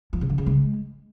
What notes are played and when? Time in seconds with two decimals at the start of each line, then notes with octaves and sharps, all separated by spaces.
0.13 F3
0.21 C#3
0.30 D3
0.38 C#3
0.46 G#3